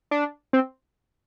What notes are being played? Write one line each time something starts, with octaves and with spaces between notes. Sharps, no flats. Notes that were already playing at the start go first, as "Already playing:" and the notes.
D4
C4